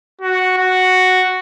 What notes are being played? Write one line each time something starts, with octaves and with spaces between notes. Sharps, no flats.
F#4
F#4